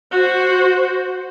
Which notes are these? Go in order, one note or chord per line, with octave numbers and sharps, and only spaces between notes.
F#4 C5